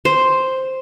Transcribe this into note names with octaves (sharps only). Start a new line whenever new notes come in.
C5